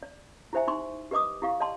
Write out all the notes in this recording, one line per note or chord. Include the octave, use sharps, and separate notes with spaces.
D5
E4 G4 C5 E5 G#5
D#4 C6 C#6
G4 B4 D#5 D6 D#6
E4 G4 F5 C#6
D5 D#5 A5 C6